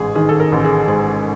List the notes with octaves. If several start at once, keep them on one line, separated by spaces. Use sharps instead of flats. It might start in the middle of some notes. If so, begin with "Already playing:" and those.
Already playing: A1 G#2 G#4
D#3 G#4
A4
A#4
A1
G#4
G#2 G#4